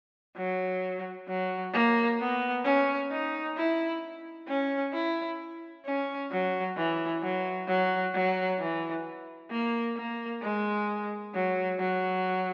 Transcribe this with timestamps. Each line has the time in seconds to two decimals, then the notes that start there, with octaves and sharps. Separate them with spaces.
0.37 F#3
1.28 F#3
1.74 A#3
2.20 B3
2.64 C#4
3.11 D#4
3.57 E4
4.48 C#4
4.93 E4
5.86 C#4
6.31 F#3
6.77 E3
7.22 F#3
7.67 F#3
8.14 F#3
8.59 E3
9.50 A#3
9.96 A#3
10.43 G#3
11.34 F#3
11.79 F#3